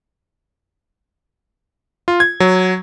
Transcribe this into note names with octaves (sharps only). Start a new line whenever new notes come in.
F4
G#6
F#3